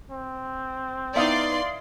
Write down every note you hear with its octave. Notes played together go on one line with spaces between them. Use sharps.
C4
B3 D#4 E4 D5 F5 C6 D#6